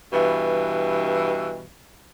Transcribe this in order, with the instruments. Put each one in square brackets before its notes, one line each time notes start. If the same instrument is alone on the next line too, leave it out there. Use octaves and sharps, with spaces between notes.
[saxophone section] G2 B2 E3